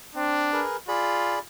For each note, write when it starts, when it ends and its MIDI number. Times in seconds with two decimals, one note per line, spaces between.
0.15 0.51 60
0.15 0.65 62
0.53 0.77 68
0.53 0.77 70
0.53 0.77 71
0.88 1.38 65
0.88 1.39 68
0.88 1.39 74
0.88 1.39 83